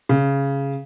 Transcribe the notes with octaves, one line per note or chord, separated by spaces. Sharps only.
C#3